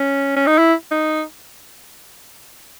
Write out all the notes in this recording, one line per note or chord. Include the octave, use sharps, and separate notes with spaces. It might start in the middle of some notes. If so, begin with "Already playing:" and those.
Already playing: C#4
C#4
D#4
E4
D#4